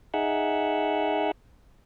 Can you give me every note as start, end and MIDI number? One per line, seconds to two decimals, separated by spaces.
0.14 1.31 63
0.14 1.31 68
0.14 1.31 76
0.14 1.31 78